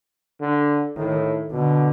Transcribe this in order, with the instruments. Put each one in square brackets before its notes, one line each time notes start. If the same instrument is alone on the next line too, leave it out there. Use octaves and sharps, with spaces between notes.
[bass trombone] D3
[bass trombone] A2 [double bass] D#3
[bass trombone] B2 [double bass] D3